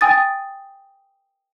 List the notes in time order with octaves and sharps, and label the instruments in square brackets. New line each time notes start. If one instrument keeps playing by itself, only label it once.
[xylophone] G5 G#5 D#6 A6